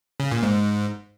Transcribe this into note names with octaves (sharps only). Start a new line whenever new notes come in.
C#3
A#2
G#2